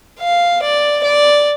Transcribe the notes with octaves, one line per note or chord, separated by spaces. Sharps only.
F5
D5
D5